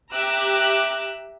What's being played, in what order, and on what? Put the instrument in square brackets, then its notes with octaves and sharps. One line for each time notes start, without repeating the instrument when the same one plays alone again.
[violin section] G4 E5 A#5 D6 E6 F#6